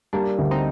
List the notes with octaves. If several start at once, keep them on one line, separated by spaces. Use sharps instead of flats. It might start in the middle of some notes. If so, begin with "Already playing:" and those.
G3 A#3 D4
D2
C4 D#4